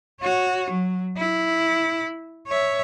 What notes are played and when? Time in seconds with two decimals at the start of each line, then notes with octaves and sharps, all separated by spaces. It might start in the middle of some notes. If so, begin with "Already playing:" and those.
0.21 F#4 C#5
0.70 F#3
1.17 E4
2.47 C#5 E5